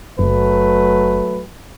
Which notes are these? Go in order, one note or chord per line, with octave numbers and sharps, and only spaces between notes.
F#1 F#3 A3 B4